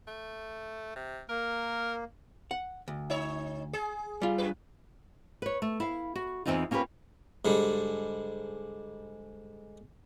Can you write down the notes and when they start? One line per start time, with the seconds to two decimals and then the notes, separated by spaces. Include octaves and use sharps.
0.07 A3
0.96 C3
1.29 A#3 A#4
2.51 F#5
2.88 D2
3.10 D#4 C#5
3.73 G#4
4.22 G3 F4
4.38 F#2 B4
5.42 B4 C#5
5.62 A3
5.80 E4 F5
6.16 F#4
6.45 E2 D#3 E3 C4 D#4 F4
6.71 A#3 C#4 F4 G4 B4
7.45 G#2 D3 G3